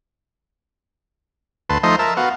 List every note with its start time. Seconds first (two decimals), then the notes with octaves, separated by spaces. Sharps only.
1.70 D2 B4 A5 C6
1.83 F3 A3 D#4 C5 D#5 C6
1.99 A#4 E5 A5
2.17 B3 F#4 F5